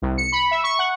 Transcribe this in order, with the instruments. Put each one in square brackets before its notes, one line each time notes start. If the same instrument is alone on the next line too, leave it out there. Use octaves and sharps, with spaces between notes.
[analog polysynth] C2
C#7
B5
E5
C#6
F#5